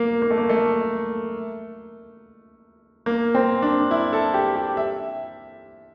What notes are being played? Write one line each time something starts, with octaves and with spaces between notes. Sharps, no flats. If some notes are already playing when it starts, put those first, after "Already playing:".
Already playing: A#3
A#3
A3
A#3
A3
A#3
C4
D4
E4
A4
G4
G4
E5